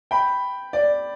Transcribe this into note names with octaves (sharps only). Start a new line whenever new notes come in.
G5 B5
D5